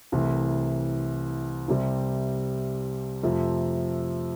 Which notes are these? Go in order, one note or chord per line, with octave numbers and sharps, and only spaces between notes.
C2 C3 E3 A3
C2 C3 G3
F2 C3 F3 A3